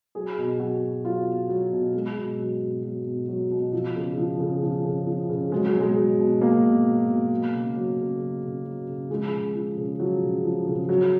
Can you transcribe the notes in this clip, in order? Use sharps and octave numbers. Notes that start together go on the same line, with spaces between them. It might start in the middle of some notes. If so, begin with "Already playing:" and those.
F#3 G#4
B2
F#3 F#4
B2
F#3 F4
B2
F#3
B2
F#3 G#3
B2
F#3
B2
F#3
B2
F#3
B2
F3
C#3
F3
C#3
F3
C#3
F3
C#3
F#3 G#3
F#3
B2
G#3
F#3
B2
F#3 A#3
B2
F#3
B2
F#3
C#3
F#3
C#3
F#3
C#3
F#3
C#3
F3 G#3
C#3
F3
C#3
F3 F#3
C#3
F3
C#3
F#3